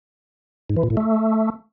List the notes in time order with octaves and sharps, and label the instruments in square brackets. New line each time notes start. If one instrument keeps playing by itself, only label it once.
[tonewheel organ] G#2
E3
A#2
A2
A3